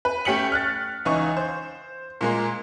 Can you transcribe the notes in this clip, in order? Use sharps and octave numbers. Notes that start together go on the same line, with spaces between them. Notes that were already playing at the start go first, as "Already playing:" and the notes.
B4
A3 C#4 G4 B6 C#7 F#7
F6 F#6 A6
C#2 E3 D#4 C#6
C5
A#2 G#3 A#3